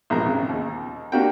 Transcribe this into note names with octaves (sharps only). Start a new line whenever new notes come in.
A#1 E2 G#2 A#5
G#1 C#3
D#2
A#3 D4 F#4 G4 F#5 G5